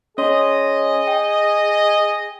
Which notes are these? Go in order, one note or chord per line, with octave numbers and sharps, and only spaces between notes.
C#4 G#4 C#5 D#5 C6
G5